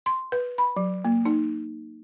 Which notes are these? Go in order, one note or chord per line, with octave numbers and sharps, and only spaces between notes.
C6
B4
B5
F#3
A#3
D#4